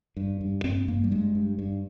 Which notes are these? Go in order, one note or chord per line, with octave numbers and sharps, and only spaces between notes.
G2
G2
G2 C4
G2 A#3
G3
G2 G#3
G2
G2